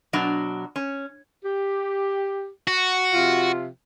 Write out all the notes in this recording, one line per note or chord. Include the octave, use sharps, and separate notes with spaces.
B2 F#3 D4 F#4
C#4
G4
F#4
C3 F3 F4